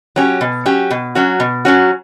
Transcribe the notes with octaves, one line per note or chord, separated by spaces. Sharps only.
F#3 C#4 G4
B2
F#3 C#4 G4
B2
F#3 C#4 F#4
B2
F#3 C#4 F#4